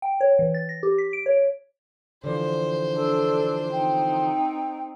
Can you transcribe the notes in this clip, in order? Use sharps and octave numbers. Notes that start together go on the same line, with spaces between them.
G5
C#5
E3
A6
A#6
G4
B6
D7
C#5
D3 E3 F3 C5
D4 A4
C4 D#4 G5